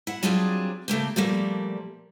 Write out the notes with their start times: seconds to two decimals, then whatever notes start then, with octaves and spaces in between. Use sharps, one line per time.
0.07 E4 F#5
0.23 F#3 G3 C4 D4 F4 G#4
0.88 C#3 A3 A#3 G4
1.16 A#2 F3 G3 A3 A#3